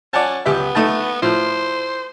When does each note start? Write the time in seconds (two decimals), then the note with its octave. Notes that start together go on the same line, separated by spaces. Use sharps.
0.13 C#4 D5 F#5 A5
0.46 C#2 B3 G4 E5
0.75 A3 D#4 A5
1.22 A2 F3 C5